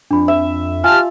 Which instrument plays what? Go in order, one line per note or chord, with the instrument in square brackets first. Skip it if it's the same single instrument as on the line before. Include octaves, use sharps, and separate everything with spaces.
[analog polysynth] F2 [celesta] D4 B5
[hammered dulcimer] E5
[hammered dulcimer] F4 [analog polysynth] G4 A5 [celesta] G#5 [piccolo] F6